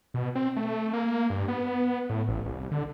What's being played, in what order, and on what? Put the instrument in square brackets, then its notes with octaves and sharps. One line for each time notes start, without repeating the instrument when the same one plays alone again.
[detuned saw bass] B2
C4
A3
A#3
A#3
G2
B3
A2
A1
C2
D3